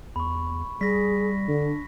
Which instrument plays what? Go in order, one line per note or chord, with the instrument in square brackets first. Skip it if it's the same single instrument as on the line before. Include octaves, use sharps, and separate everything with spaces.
[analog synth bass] E2 [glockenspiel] B5 C#6
[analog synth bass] G3 [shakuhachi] G#4 [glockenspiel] A#6 B6
[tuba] D3 [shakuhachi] D4